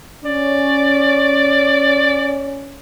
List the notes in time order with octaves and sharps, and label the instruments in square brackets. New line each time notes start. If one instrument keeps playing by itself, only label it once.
[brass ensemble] C#4 [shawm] D5